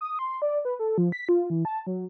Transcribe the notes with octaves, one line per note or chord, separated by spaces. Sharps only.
D#6
C6
D5
B4
A4
F3
B6
F4
E3
A5
F#3